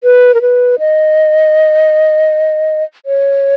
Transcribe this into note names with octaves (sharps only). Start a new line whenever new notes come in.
B4
A#4
B4
D#5
C#5